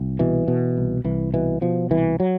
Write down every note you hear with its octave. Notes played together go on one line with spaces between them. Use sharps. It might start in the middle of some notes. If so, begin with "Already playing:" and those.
Already playing: C2
B2 E3
B2
C2
C2 E3
B2 E3
B2 F3
C2 E3
F#3